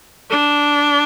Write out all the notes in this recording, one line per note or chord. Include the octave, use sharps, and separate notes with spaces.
D4